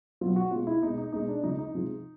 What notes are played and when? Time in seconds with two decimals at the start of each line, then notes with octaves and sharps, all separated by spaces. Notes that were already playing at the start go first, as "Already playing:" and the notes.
0.21 B2 F#3 F4
0.36 F#4
0.51 B2 G#3 F4
0.67 E4
0.82 B2 G#3 D#4
0.98 D#4
1.13 B2 G#3 D#4
1.28 D4
1.43 C#3 F3 G#3 D#4
1.59 D#4
1.74 C3 F3 G#3